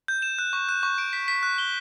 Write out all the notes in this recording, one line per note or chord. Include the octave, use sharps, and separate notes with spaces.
G6
E7
F#6
C#6
F#6
C#6
D7
B6
B6
F#6
G7